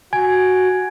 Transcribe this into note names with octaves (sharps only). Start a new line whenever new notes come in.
F#4 G#5 G#6